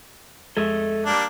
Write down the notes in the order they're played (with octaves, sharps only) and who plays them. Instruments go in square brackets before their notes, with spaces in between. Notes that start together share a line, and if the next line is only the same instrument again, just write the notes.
[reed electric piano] F2 G#3 G#6 [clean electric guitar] A4 D#5 E5
[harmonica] G3 A#3 D4